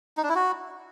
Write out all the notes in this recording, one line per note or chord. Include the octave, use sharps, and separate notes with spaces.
D#4
D4
E4
F#4